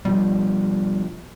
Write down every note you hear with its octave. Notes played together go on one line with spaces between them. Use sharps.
B2 F3 G3